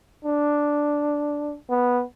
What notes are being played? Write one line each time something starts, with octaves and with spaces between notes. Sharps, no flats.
D4
B3